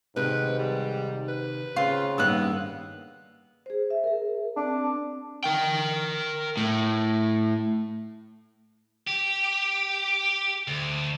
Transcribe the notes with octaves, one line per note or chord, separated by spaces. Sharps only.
G#2 C3 D#3 B4
G3
B4
C#3 C4 F4
G2 D#3 A#3 B3 E6 F#6
G#4 C5
E5
G#4 A#4
C4 D4
A#4 G5
A2
G4
D2